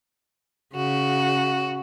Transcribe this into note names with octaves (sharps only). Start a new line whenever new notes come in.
C#3 F#4